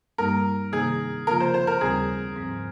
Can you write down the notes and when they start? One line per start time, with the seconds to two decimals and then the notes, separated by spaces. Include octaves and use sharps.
0.18 G2 G3 A#3 D#4 A#4
0.72 C3 D#3 A#3 D#4 G#4
1.27 C#3 F3 A#3 F4 A#4
1.40 C5
1.54 C5
1.67 A#4
1.81 D#2 C#3 G3 C4 G#4
2.36 G#2 F3 C4